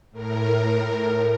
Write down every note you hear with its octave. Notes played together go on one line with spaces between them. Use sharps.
A2 A#4